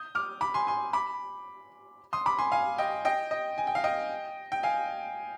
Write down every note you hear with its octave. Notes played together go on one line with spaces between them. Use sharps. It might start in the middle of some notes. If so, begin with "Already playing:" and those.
Already playing: D#6 G6
D6 F6
B5 D6
G#5 C6
G#5 C6
B5 D6
C6 D#6
B5 D6
G#5 C6
F5 G#5
D#5 G5
D#5 G5
D#5
G#5
G5
F5
D#5 G5
G5
F5 G#5